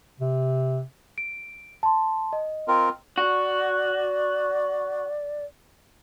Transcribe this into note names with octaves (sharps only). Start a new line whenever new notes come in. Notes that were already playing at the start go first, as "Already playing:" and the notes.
C3
D7
A5 C6
D#5
C4 F4 A#4
F#4 D5